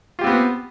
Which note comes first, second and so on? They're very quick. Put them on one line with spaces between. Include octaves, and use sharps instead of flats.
F4 G4 C4 B3